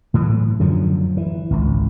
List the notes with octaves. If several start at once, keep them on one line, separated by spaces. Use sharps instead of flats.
A2 E3 F#3
F#2 D3 F3 F#3
E3
G#1 C#2